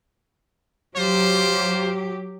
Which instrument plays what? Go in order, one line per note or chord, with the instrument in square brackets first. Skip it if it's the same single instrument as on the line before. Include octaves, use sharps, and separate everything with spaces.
[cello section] F#3 G4 [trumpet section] F4 C5